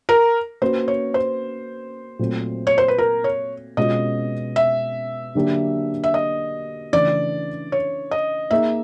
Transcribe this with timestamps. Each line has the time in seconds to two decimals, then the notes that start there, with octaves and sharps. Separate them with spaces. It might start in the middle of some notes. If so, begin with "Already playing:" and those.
0.09 A#4
0.62 A#3 C#4 F#4 B4 C5
0.88 C#5
1.14 C5
2.19 A#2 F#3 A3 C4
2.67 C#5
2.78 C5
2.88 B4
2.98 A#4
3.24 C#5
3.77 B2 G#3 C#4 F4 D#5
4.56 E5
5.35 D3 F#3 A#3 D4 G4
6.04 E5
6.14 D#5
6.93 C#3 E3 A3 D4 D5
7.72 C#5
8.11 D#5
8.51 A#3 D#4 G#4 E5